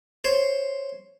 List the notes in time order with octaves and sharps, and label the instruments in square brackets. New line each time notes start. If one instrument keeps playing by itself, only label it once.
[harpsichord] C5 C#5